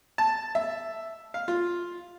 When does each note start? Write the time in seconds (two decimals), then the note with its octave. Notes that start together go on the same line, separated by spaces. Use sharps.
0.18 A5
0.55 E5
1.34 F5
1.48 F4